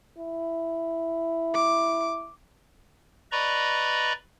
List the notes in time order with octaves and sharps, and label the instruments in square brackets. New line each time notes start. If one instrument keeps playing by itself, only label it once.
[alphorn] E4
[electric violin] D6
[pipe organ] B4 D5 D#5 A#5 B5 C#6